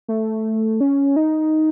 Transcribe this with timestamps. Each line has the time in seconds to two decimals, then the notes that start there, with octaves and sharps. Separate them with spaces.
0.08 A3
0.80 C#4
1.16 D#4